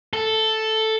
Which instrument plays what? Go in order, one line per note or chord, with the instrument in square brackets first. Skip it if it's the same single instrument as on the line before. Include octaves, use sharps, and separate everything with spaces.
[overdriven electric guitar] A4